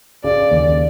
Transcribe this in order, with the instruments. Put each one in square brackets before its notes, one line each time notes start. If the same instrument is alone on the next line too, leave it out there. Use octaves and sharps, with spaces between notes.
[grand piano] C#3 [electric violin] D5
[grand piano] D#2